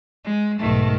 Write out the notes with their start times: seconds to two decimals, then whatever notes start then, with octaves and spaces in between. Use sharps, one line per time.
0.25 G#3
0.59 B1 G#2 D#3 A3